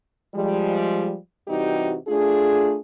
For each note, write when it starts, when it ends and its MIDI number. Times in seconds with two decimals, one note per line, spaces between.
0.35 1.16 53
0.35 1.16 55
0.35 1.16 56
1.48 1.96 48
1.48 1.96 52
1.48 1.96 55
1.48 1.96 63
1.48 1.96 66
1.48 1.96 67
2.08 2.79 57
2.08 2.79 62
2.08 2.79 65
2.08 2.79 68